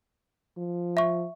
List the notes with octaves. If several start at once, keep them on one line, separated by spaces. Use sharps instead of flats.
F3
E5 C#6